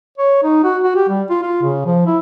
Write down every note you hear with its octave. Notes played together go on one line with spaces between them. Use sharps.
C#5
D#4
F#4
F#4
G4
G3
F4
F4
C#3
F3
E4